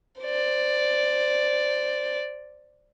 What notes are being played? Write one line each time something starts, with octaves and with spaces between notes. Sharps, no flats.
C5 D5